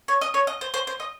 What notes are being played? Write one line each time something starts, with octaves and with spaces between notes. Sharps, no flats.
C#5
D#5
C#5
D#5
C5
C5
C5
D#5